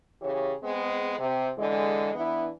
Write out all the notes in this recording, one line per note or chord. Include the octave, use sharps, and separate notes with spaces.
C#3 E3 G4 C#5
G#3 B3 C4 G#4
C3
D3 E3 G#3
E3 B3 D4 E4